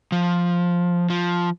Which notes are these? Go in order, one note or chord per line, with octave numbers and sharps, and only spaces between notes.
F3
F3